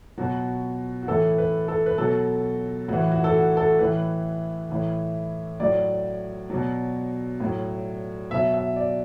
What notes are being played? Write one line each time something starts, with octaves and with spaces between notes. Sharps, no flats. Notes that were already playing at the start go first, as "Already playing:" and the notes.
B2 F#3 F#4
F#4
A2 E3 A4
B4
A4
B4
B2 F#3 A4
A2 E3 F#4
F#4
A4
F#4
A4
A2 E3 B4
A2 E3
A2 F#3 D5
B2 F#3
A2 F#3
B2 F#3 E5
E5
D5